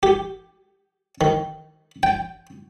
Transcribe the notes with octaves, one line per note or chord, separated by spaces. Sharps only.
G4
D#3
G5